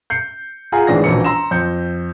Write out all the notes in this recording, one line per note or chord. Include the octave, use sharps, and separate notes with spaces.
G6 C7 C#7
F4 G#4 F5 F#5 G#5 A#5
G#1 A2 E3 D4 G#4 A#6
E1 A#1 B2 E3 C#4 C#7
A#5 C6 E6 A#6 E7
F2 G6 C#7